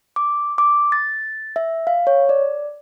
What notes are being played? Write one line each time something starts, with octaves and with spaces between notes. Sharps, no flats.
D6
D6
A6
E5
F5
C#5
D5